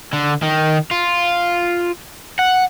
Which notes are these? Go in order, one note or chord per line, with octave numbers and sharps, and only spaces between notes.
D3
D#3
F4
F#5